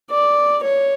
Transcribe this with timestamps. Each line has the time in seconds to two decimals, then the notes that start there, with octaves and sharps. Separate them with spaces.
0.11 D5
0.64 C#5